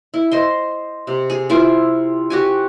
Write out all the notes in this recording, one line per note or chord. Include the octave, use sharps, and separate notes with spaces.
E4
C5 D#5 C6
C3
G#4
E4 F4 C5 D6
F#4 G4 G#5